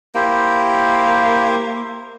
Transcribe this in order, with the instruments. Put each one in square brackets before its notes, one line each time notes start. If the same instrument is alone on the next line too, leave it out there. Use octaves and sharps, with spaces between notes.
[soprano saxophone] A#3 [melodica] E4 G4 C5